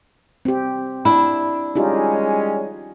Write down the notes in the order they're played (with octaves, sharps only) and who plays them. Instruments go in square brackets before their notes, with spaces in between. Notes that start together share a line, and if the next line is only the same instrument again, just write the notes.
[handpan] C4 G4
[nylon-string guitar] D4 E4 [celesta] B5
[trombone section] G3 G#3 C#4 [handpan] D#4 F4 G4